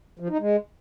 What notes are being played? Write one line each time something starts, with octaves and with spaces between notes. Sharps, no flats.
F3
D#4
G#3